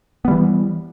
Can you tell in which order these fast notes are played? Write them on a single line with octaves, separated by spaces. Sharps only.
B3 G3 E3